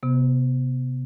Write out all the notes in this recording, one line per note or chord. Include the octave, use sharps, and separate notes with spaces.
C3 B3